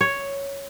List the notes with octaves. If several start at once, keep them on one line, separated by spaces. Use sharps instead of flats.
C#5